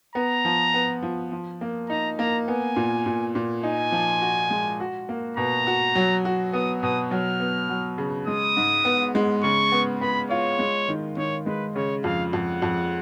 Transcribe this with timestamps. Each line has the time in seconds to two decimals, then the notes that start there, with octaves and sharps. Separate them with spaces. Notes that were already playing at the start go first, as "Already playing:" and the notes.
0.15 B3 A#5
0.45 F3
0.74 B3
1.02 F3
1.32 F3
1.61 A#3
1.89 D#4 A#5
2.18 A#3 A#5
2.48 B3 G#5
2.76 A#2
3.06 A#2
3.35 A#2
3.63 D#4 G#5
3.92 F3
4.21 F#4
4.50 G#3
4.80 F#4
5.09 A#3
5.37 B2 A#5
5.67 F#4
5.95 F#3
6.25 F#4
6.53 B3 D#6
6.82 B2 D#6
7.11 F#3 F6
7.40 B3
7.69 F#3
7.98 C#3
8.27 G#3 D#6
8.57 G#2
8.85 B3
9.15 G#3
9.43 C#3 C#6
9.72 B3
10.01 B3 B5
10.30 F4 C#5
10.59 G#3
10.89 D#3
11.17 D#3 C#5
11.46 G#3 B4
11.75 C#3 C#5
12.04 F2 F5
12.33 F2 F#5
12.62 F2